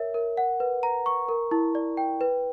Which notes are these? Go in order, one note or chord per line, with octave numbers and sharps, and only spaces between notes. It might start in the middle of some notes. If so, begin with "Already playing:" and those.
Already playing: A#4 C#5 E5
A#4
F#5
B4
A#5
C#6
A#4
E4
D5
G5
B4